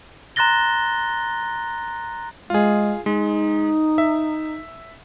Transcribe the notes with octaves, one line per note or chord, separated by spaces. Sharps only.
A#5 C6 F#6 A6 A#6 G7
G#3 F4 G#4
G#3 D#4
E5